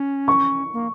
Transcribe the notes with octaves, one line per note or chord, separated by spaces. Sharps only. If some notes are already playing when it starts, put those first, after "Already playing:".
Already playing: C#4
C#6
A#3